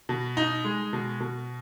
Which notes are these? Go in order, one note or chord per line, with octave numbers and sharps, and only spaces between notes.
B2
D#4
G#3
B2
B2